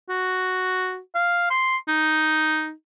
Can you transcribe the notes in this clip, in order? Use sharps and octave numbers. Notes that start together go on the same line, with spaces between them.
F#4
F5
C6
D#4